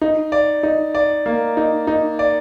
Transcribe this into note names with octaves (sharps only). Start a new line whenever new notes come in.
D#4
D5
D#4
D5
A#3
D#4
D#4
D5